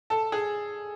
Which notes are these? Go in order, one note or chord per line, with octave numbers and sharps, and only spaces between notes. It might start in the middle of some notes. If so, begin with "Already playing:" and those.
A4 A5
G#4 G#5